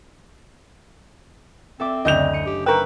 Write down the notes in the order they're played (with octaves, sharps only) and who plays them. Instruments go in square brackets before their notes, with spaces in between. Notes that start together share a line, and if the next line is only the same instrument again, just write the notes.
[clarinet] C4 [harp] A4 E5 D6
[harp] F#1 D2 [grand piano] D#5 G6 F7
[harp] C#7 D#7
[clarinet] G4
[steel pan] A#4 G5 [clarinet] B4 [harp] C#6 E6